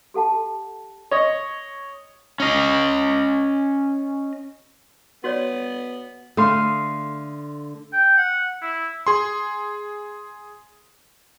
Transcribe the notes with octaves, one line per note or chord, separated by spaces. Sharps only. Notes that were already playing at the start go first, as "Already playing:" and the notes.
G4 A4 F#5 A5
C#5 D#5
C#4 D#5
B3 F#4 C#5 D5
D3 A3 F5 C6 D#6
G5
F#5
E4
G#4 C6